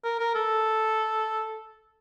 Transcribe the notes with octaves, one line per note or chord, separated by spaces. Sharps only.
A#4
A#4
A4